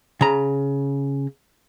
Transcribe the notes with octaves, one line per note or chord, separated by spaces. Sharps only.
C#3 A#5